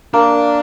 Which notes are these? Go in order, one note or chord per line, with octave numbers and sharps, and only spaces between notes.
A#3 D4